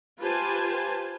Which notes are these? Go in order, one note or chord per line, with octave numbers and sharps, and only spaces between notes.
F4 G4 B4 C5 G#5 A5